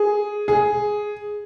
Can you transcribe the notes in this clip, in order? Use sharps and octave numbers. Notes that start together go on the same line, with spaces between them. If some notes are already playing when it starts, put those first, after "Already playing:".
Already playing: G#4
G#4